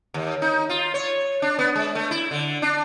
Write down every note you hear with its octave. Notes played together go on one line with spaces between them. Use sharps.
D#2
D#4
F4
C#5
D4
B3
G#3
A3
E4
D3
D4